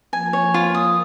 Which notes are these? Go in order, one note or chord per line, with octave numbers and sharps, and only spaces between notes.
F3 A#3 G#5
C#5
F4
D#6